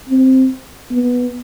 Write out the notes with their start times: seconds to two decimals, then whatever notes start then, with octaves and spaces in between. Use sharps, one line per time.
0.09 C4
0.91 B3